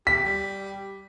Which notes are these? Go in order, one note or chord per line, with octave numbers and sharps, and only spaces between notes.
G4 B6
G3